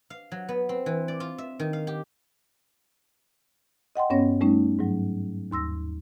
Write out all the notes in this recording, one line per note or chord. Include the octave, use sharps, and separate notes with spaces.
F5
F#3
B3
C4
E3
D5
F4
E5
D#3
F5
G4
D#5 F#5 G5 C6
G2 B3 C#4 C#5 A#6
G3 A3 C#4 D#4
G#2 F#3
D#2 C6 E6 A#6